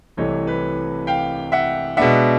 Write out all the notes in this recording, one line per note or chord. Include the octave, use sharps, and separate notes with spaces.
C2 C3 E3 A3 C#5 D#5
B4 C#5
F5 G5
E5 F#5
B2 G#3 B3 D4 E5 F#5